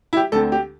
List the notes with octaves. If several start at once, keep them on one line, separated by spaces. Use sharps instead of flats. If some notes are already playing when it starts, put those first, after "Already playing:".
E4
G4
D2 D3 C4 A4
G4